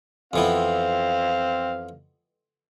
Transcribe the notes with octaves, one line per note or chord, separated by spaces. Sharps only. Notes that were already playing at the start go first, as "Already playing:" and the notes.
F2 E3 B3 C4 F5